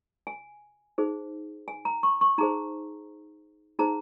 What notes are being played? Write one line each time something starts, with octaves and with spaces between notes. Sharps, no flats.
G#5
D#4 G#4 C5
G#5
A#5
C#6
C#6
D#4 G#4 C5 A#5
D#4 G#4 C5 A#5